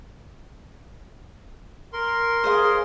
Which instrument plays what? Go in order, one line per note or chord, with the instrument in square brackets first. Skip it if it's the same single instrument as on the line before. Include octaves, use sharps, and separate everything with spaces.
[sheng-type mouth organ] A#4 C6
[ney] G#4 [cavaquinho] C5 D#5 F5